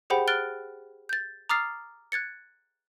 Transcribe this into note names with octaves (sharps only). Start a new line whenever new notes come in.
G4 G#4 C5 F#5 G5 B5
F6 F#6 A6 D7 G7
G6 A6
A#5 D6 D#6 F6 A6 C7
F#6 G#6 A6 C#7